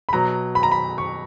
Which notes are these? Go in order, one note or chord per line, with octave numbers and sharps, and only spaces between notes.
B5
B2 F#3 A#5
B5
A#5
B5
C#6